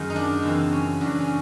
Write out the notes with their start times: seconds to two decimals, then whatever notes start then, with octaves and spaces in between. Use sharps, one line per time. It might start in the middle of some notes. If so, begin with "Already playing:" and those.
Already playing: F#2 D#3 G#4
0.10 D#4
0.16 D4
0.42 F#2 C#3 E3 C4
0.73 C#4
1.01 F#2 C#3 E3 D4
1.19 C#4